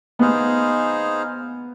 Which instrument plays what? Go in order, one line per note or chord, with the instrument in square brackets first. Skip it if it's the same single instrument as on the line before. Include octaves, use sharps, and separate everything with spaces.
[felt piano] B3 [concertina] D#4 G#4 C5 F5